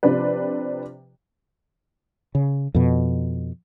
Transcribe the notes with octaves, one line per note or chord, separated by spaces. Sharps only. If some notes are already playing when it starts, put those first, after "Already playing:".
C3 F3 C4 D4 B4
C#3
F2 B2